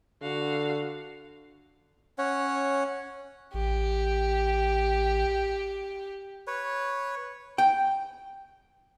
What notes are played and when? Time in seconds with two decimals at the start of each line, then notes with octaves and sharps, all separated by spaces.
0.22 D3 F#4 F5
2.18 C#4 C#5 F#5
3.54 A1 G4
6.47 B4 C#5
7.58 G5